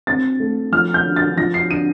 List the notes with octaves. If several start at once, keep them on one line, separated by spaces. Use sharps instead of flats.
C4 A6
A3
F3 F6
G6
D3
A6
F3 A#6
C7
D3 D#7